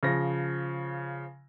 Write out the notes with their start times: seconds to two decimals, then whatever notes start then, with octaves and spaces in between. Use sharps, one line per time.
0.03 C#3 F3 A#6